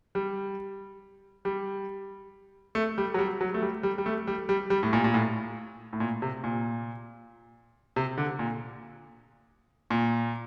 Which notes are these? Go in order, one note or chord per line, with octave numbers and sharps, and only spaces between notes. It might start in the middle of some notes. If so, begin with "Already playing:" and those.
G3
G3
A3
G3
F#3
G3
F#3
A3
G3
G3
G3
A3
G3
G3
G3
A2
A#2
A#2
A2
A2
A#2
C3
A#2
C3
D3
A#2
A#2